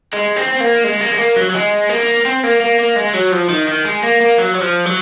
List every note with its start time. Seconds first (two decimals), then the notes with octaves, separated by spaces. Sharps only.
0.13 G#3
0.36 C4
0.52 C4
0.60 A#3
0.84 G#3
1.01 A#3
1.12 G#3
1.19 A#3
1.36 F#3
1.50 F#3
1.55 G#3
1.89 A#3
2.25 C4
2.44 A#3
2.60 A#3
2.79 A#3
2.96 G#3
3.14 F#3
3.32 F3
3.50 D#3
3.68 D#3
3.85 G#3
4.03 A#3
4.21 A#3
4.38 F#3
4.55 F#3
4.62 F3
4.86 F#3